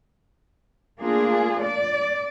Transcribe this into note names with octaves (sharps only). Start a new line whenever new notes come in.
A3 A#3 D4 F4 G#4
D5